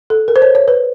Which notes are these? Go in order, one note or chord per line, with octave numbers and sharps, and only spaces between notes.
A4
A#4
C5
C#5
C#5
B4